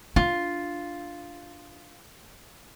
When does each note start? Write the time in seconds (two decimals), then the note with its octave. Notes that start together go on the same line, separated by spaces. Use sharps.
0.16 D4 F4